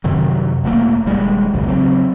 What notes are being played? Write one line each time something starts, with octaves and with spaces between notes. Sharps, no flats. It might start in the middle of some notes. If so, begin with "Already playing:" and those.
F#2 C3 D#3 F#3
E1 A3 A#3
D#1 G3 G#3
A#1 E2 C#3 F#3
C#3 F#3 C4